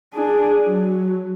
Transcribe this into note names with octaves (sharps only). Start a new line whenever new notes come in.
D4 G#4
F#3